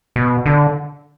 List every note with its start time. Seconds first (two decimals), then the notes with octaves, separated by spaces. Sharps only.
0.16 B2
0.46 D3